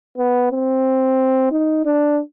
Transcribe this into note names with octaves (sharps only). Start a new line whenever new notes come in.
B3
C4
D#4
D4